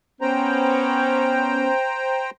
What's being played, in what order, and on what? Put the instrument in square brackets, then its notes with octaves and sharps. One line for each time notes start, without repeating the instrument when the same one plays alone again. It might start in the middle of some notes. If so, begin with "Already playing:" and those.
[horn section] B3 C#4 [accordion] C5 G5 A#5